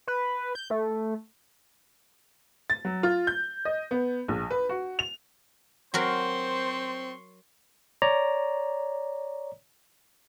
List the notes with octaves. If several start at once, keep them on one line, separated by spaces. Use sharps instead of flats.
B4
G6
A3
A6
F#3
F4
G6
D#5
B3
A#1
B4
F#4
F7
F#3 C4 F#4 A#4 C5 C6 C#6
C#5 D5 A#5